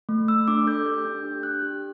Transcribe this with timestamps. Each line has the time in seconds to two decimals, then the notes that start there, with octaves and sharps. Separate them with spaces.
0.09 A3
0.28 A3 E6
0.48 D4 D6
0.67 A4 G6
0.86 G4 G6
1.05 D4
1.25 G4
1.43 D4 F#6
1.63 G4